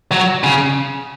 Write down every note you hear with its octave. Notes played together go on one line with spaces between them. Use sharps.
F#3
C#3